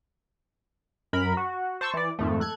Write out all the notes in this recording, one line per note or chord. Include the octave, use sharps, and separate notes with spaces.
F#2 A#4 B5
F#4
C5 A5 C#6 E6
E3 D5
F2 G#2 D#3 A3
A4 F#6 G#6